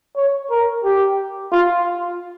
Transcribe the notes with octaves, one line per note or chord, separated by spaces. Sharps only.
C#5
A#4
G4
F4